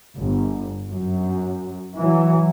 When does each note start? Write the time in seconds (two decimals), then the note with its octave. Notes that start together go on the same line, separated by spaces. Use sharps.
0.16 G1
0.88 F#2
1.97 E3 F#3